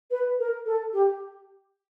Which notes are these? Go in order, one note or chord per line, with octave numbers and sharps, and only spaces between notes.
B4
A#4
A4
G4